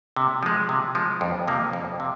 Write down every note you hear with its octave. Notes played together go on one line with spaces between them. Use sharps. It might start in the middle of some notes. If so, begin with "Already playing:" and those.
C3
F3 G#3
C3
F3 G#3
F2
C3 F3 A#3
F2
C3